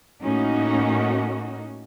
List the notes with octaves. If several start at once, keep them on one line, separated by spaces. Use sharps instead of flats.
A2 A#3 C#4 D#4 F#4